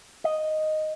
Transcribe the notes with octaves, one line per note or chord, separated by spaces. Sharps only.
D#5